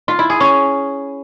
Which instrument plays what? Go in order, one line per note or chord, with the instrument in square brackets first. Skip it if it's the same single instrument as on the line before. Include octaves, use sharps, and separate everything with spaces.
[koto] F4
E4
G#4
C#4